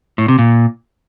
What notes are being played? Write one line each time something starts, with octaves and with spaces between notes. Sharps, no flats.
A2
C3
A#2